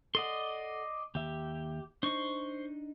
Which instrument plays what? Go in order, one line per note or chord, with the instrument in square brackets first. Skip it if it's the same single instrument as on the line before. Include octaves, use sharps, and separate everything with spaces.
[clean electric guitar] A4 F#5 [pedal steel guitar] D5 D#5 C6
[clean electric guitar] D#2 E5 [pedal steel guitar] G4
[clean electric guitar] D4 D#4 [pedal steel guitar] C5 C#6